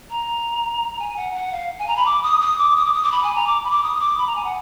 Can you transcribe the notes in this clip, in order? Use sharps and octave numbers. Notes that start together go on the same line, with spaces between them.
A#5
G#5
F#5
F#5
F5
G#5
A#5
B5
D6
D#6
D#6
D6
D#6
D6
D#6
D6
B5
G#5
A#5
D6
B5
D6
D#6
D#6
D6
B5
A#5
G#5
F#5